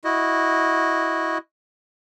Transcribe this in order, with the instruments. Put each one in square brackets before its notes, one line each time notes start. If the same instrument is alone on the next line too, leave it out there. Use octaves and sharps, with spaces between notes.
[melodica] E4 F#4 D#5